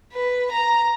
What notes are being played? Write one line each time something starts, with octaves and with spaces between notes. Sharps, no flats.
B4
A#5